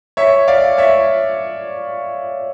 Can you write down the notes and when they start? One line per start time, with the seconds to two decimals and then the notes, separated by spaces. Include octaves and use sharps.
0.17 C#5 E5
0.48 D5 F5
0.78 C#5 E5